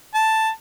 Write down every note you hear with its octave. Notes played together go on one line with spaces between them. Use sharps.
A5